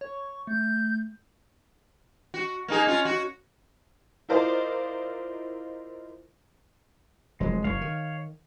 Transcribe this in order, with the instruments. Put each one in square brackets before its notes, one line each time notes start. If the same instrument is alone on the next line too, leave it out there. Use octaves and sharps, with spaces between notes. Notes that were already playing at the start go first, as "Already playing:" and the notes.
[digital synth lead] C#5 [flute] C#6
[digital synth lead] A3 [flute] G6
[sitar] F#4
A#3 D#4 G#4
C#4 F4
F#4
[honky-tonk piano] E4 F4 A#4 C5 D5 D#5
[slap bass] F1 F3 F#3 [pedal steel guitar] G#3
[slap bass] F#1 [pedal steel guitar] C#5 F5
[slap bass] D#3